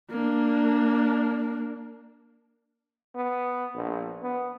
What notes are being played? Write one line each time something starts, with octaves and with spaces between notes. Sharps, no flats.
A#3 D4
B3
A#1
B3